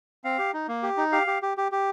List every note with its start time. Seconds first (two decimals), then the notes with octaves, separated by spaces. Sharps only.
0.24 C4 F5
0.38 G4
0.53 D#4
0.68 A#3
0.83 G4
0.97 D#4
1.12 G4 F5
1.27 G4
1.42 G4
1.57 G4
1.72 G4